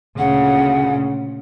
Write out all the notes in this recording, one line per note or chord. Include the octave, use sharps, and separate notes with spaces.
D2 A#2 C#3 F#5